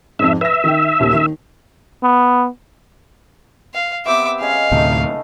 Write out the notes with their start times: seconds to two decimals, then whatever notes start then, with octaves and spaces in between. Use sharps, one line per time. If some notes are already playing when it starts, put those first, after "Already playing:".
0.19 F2 G#2 E5
0.41 B4 E5 A#6
0.64 D#3 G5
1.00 D#1 D#2
1.13 D#3
2.03 B3
3.74 F5
4.06 B3 C4 G4 E5 D6
4.41 G#3 C#4 F5
4.72 D2 A2 C3 A3 D#4